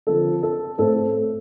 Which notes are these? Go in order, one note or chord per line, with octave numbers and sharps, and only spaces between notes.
D3 F3 C4 A4
A4
A2 A3 C4 A4